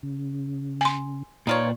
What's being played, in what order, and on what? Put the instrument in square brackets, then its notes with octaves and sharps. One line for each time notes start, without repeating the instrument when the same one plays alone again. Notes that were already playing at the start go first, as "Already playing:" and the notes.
[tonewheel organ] C#3
[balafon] G#5 C6
[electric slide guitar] A#2 D5 [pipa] D#4 F4 C#5 [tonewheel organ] B4 G5 A5